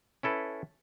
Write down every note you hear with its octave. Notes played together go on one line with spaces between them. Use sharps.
C#4 E4 A4 B4